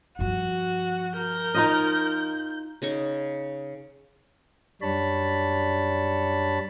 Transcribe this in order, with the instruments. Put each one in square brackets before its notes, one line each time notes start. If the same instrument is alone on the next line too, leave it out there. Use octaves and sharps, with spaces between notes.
[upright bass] G2 F3 [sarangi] F#4
[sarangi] A#4 [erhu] G6
[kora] D#4 F4 D#5
[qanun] C#3 D#4 C#6
[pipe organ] F#2 G3 D4 C#5 A5 B5